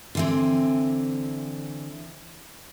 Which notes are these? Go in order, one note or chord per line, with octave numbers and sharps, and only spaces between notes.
D3 E3 C4